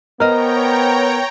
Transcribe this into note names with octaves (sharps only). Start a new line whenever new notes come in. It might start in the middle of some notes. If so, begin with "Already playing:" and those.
B3 A#4 C5 C#5 D#5 G5 A#5 F6